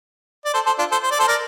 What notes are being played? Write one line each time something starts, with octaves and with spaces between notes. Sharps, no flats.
D5
A4 C5
A4 C5
D4 F4
A4 C5
C5
D5
A4 C5
A#4 D5